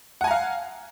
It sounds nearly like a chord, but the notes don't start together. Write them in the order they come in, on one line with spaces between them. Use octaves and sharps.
F#5 G#5 A#5 F5